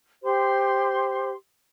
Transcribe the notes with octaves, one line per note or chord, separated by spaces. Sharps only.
G4 C5 C6